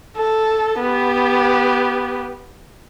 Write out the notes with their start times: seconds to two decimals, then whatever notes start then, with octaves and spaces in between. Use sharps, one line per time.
0.17 A4
0.79 B3 G4